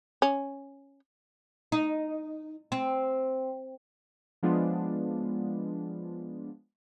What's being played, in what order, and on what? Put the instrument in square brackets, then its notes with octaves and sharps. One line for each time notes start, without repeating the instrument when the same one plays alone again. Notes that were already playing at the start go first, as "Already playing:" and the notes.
[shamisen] C#4
[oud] D#4
C4
[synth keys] F3 G#3 B3 D4 F4